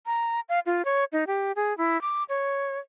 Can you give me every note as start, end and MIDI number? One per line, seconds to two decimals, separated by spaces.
0.06 0.40 82
0.49 0.60 77
0.66 0.85 65
0.85 1.04 73
1.12 1.24 63
1.27 1.52 67
1.56 1.76 68
1.78 2.00 64
2.02 2.23 86
2.29 2.79 73